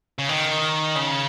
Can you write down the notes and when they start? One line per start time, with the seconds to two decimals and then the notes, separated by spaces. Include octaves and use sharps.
0.19 C#3
0.29 D#3
0.96 C#3